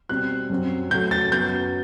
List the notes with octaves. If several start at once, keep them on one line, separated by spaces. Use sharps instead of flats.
B2 G3 C4 F#6
F#2 F#3 C4
F#2 F#3 A3 G6
A6
F#2 F#3 B3 G6